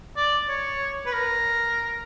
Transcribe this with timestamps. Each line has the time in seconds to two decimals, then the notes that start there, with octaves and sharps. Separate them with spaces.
0.16 D5
0.49 C#5
1.06 B4
1.12 A#4